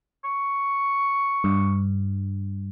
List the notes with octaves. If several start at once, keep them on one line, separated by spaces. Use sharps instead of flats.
C#6
G2